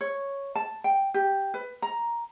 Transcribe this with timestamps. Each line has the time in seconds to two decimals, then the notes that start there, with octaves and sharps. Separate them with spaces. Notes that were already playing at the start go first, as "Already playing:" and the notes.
0.01 C#5
0.55 A5
0.84 G5
1.14 G4
1.54 B4
1.82 A#5